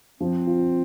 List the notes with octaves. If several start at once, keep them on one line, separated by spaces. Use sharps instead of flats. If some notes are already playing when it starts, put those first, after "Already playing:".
F3 C4
F4